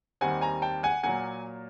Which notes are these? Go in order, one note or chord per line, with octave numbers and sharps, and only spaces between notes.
D#2 D#3 G3 C4 F#5 G#5
G#5 A#5
G5 A5
F#5 G#5
A#2 F#3 A#3 F#5 G#5